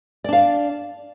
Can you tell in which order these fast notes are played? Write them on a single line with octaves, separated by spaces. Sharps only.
D5 D4 F5